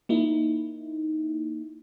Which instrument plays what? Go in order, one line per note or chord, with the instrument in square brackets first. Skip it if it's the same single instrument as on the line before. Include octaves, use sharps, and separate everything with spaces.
[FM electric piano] A#3 D#4 E4